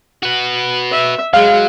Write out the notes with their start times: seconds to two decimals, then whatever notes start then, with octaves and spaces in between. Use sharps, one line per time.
0.23 F#4 B4
0.91 E5
1.34 F#3 G#3 F5